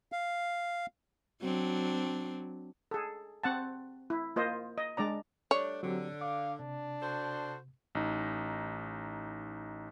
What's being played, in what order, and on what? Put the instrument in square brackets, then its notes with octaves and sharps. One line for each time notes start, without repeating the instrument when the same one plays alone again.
[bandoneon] F5
[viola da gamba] F#3 C4 D4
[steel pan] G#4 A4
C4 F#5 A5
E4
A#3 F4 C5 D#5
D#5
G#3 D4 D5 A#5
[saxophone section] G3 A3 D4 [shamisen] C#5
[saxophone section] D3 [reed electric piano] F#3 C4 G4
[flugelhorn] F5 [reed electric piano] D6
[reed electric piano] C3 [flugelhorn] D4
[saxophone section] F#4 A4 C5
[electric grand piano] A1 D#4